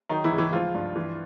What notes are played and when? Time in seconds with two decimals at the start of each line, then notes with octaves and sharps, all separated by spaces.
0.09 D#3 F#3 D#4
0.24 E3 E4
0.32 C#2
0.38 E3 E4
0.53 F3 G#3 F4
0.74 G2
0.96 E3